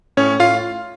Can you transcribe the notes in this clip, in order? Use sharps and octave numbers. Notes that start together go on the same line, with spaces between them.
A2 C#4 C#5
A2 F4 F5